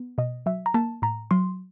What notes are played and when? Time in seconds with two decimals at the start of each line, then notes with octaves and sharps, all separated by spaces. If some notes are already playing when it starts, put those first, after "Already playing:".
Already playing: B3
0.18 B2 D#5
0.46 F#3 E5
0.66 A#5
0.74 A#3 A5
1.02 A2 A#5
1.31 F#3 C6